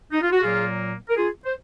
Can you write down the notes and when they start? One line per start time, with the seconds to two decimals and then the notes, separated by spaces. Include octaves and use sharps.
0.12 D#4
0.22 F4
0.32 F#4
0.42 A#2 F#3 A#3 F4 G#4
1.09 A#4
1.16 F4 G#4
1.45 C5